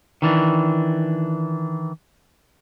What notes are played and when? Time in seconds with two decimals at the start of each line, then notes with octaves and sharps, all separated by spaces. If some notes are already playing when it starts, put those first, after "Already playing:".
0.22 D#3 E3 D4